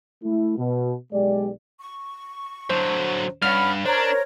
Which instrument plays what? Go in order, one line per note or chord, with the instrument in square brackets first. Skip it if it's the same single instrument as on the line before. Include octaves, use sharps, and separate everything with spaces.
[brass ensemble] A3 E4
B2
B1 G#3 G4 D5
[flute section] C#6
[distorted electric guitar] D3 F#3 [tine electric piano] C5
[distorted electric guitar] G2 [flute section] C#4 F#5 B5 [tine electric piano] F6
[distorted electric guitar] D4 [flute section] A#4 C#5 [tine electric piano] C5